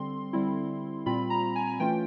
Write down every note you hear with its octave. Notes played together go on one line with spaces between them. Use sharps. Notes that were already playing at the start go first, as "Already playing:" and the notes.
Already playing: D3 G3 C4 C6
D3 G3 C4 E4
A#2 G3 C4 F4 B5
A#5
G#5
G#5
E3 A3 C#4 F4 G5